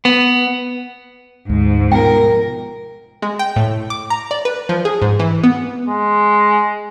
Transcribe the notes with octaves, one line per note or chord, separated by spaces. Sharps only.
B3
D2 G#2
B2 F3 A#4 G5
G#3
G5
A2
D6
A#5
D5
B4
F3
G#4
G#2
E3
B3
G#3